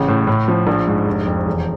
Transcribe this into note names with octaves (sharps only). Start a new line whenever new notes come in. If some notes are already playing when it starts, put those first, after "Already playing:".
Already playing: A1 C#3
A2
A2
F3
A#1
G#2
F1
F2
E1